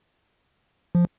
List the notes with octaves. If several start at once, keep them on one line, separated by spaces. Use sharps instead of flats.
F3